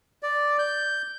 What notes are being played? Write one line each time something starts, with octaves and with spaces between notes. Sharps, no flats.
D5
G6